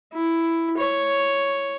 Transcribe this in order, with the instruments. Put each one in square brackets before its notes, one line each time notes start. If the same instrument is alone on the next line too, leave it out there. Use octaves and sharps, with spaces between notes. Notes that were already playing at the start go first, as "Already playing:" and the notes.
[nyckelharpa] E4
C#5